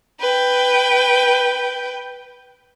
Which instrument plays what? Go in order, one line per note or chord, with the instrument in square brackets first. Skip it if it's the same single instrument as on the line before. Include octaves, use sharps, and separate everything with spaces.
[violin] B4 G5